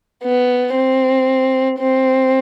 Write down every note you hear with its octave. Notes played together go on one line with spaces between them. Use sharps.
B3
C4
C4